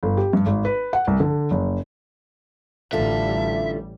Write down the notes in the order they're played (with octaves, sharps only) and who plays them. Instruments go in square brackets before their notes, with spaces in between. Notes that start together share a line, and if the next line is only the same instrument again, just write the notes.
[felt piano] G1
G4
G2
G#1
B4
F#5
C2
D3
F#1
[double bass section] A1 G3 [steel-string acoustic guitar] D3 F4 A4 [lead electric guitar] E5